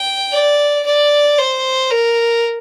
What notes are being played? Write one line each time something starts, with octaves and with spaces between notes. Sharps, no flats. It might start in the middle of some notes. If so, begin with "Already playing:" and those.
Already playing: G5
D5
D5
C5
A#4